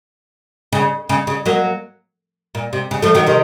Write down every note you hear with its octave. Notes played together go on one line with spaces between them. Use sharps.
C#3
C#3
C#3
F#3 A#3
A#2
C3
C#3
F3 A3
D#3 F#3
C3 D#3